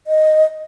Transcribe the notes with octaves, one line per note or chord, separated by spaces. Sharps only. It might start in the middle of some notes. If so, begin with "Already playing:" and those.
D#5